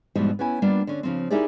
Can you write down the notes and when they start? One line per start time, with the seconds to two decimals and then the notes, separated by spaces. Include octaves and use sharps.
0.15 G#2 B2 E3 F3 G3
0.39 B3 C#4 E4 G#5
0.62 G3 A#3 B3 D4 F4
0.87 D3 C#4
1.03 C#3 F3 C4
1.30 D#4 E4 G4 G#4 A#4 D5